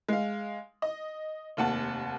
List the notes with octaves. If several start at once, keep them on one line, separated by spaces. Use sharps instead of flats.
G#3 F5
D#5
F1 D#2 F#5 A5